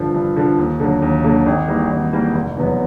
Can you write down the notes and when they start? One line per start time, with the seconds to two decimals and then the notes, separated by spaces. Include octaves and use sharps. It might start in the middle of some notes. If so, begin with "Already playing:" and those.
Already playing: G2 D3 F3
0.14 G2
0.36 D3 F3
0.58 D#2
0.80 D3 F#3 A#3
1.02 D#2
1.24 D3 F#3 A#3
1.46 G#1
1.68 G#2 E3 G3 A#3
1.90 G#1
2.12 G#2 E3 G3 A#3
2.35 F1
2.57 E2 B2 F#3 B3